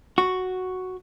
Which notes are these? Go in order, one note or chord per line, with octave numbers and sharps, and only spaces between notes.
F#4